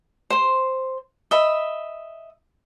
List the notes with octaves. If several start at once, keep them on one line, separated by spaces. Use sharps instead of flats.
C5 C6
D#5 E5 B5